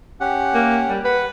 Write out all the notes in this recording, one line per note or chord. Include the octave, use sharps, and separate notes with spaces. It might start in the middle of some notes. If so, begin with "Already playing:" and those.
C#4 G4 F#5
A#3
G3
B4 F#5